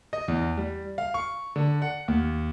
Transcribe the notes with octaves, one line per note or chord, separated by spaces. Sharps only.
D#5
E2
G3
F5
C#6
D3
F#5
D#2